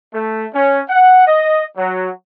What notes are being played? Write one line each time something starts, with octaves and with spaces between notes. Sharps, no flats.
A3
C#4
F#5
D#5
F#3